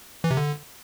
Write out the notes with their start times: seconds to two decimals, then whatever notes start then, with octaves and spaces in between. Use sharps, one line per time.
0.24 E3
0.31 C3
0.37 D3